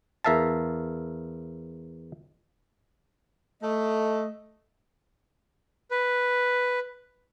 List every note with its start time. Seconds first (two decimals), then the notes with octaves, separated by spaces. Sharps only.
0.24 E2 A#4 E5 F5 A5
3.62 A3 D#5
5.91 B4